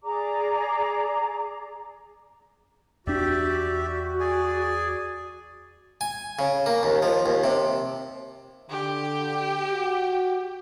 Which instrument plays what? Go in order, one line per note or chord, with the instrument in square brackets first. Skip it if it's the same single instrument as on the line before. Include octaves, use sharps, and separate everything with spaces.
[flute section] G#4 D5 A#5 D6
[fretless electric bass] E2 D4 [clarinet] F#4 [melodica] G4 D5 E5
[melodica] G#4 D5 G#5
[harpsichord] G#5
C#3
A#3
D#2
F3
D#2
C3
[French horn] D3 [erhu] G4
[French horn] F#4